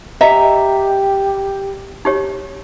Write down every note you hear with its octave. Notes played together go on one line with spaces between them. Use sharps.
G4 D#5 E5 A#5
D#4 G4 C#5